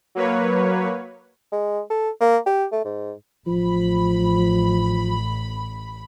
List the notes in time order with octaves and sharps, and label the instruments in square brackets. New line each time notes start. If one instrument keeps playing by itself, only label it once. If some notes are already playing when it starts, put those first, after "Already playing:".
[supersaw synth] F#3 A#3 B4 C#5
[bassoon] G#3
A4
A#3
G4
A3
G#2
[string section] A1 B5 [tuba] F3